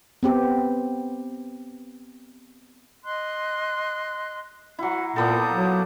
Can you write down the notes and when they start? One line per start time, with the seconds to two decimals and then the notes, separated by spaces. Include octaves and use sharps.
0.23 B3 C4 G4
3.03 D#5 C6 F#6
4.79 F#3 E4 F#4 F#5
5.16 A#2 A#3 B3 A4 A5 D#6 G6
5.52 F#3